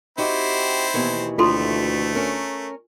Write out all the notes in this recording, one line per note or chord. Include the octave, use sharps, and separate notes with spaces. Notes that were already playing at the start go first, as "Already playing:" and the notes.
C4 D#4 E4 F#4 G4
D#2 B2 E3
D2 A3 F4 A4 C6
C#4 A#4